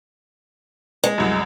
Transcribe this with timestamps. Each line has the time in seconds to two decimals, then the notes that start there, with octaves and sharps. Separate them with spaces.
1.04 G#3
1.18 C2 F#2